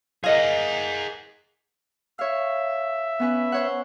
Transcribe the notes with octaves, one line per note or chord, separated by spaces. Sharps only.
G#4 A#4 D#5 F5 F#5
C#5 E5 F5
B3 C#4 B4
C5 C#5 F#5